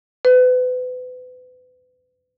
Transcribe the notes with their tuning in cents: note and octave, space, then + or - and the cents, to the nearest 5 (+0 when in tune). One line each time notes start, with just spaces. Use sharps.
B4 +35